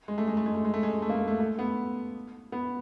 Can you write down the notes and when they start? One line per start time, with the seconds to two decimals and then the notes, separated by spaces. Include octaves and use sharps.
0.08 G#3
0.18 A3
0.28 G#3
0.37 A3
0.46 G#3
0.55 A3
0.65 G#3
0.74 A3
0.83 G#3
1.02 A3
1.09 A#3
1.15 A3
1.28 A3
1.40 A3
1.59 B3
2.52 B3